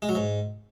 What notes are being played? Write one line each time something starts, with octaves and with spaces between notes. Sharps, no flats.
G#3
F#3
G#2